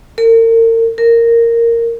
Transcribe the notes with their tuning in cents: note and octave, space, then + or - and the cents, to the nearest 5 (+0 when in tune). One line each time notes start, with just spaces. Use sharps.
A#4 -40
A#4 -10